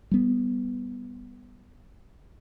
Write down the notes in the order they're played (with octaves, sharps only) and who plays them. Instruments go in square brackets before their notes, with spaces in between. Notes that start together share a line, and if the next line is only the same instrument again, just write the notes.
[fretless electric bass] G3 B3